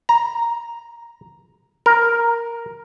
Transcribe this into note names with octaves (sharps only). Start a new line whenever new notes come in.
A#5
A#4